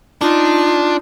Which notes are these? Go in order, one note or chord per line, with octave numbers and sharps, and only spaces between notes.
D4 D#4 F4